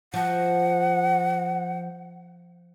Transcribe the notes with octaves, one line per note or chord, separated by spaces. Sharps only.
F3 F#5